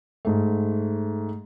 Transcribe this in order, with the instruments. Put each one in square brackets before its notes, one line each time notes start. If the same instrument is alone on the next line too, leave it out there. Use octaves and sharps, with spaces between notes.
[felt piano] G#2 A3